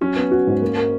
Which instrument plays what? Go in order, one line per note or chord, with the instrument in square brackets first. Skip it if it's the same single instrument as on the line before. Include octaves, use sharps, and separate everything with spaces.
[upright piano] F#3 [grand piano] C#4
[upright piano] B3
F#4
G#2
A#3
A#4